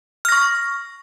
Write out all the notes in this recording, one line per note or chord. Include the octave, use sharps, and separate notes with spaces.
C#6 F6 A#6